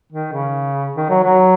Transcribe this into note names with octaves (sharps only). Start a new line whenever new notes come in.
D#3
C#3
D#3
F#3
F#3